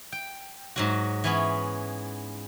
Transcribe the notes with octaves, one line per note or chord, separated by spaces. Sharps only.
G5
G#2 F#3 F#4
E3 B3 C#4